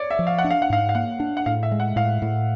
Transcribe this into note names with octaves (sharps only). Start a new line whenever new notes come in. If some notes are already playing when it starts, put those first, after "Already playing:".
Already playing: C#5 D5
E5
F3
F5
F#5
D4
F5
F#5
G#2 F5
F5
A#3 F#5
D4
F#5
A2 F5
E5
G#3
F#5
A2 F5
A2